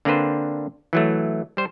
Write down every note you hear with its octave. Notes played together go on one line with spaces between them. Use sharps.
D3 A#3 C4 D4 B4 C5
E3 F#3 A3
G3 C5